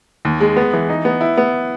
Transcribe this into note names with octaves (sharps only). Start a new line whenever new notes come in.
D#2
G#3
B3
E3
D#4
B3
E4
B3